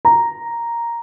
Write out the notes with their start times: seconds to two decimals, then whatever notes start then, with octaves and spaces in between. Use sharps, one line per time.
0.05 A#5